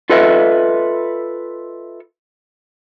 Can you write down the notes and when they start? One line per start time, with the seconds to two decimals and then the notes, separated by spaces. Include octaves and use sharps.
0.10 F4 A4 B4 D#5 E5